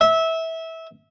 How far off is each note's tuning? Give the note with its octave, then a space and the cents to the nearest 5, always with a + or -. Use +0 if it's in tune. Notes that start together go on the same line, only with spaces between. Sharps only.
E5 -20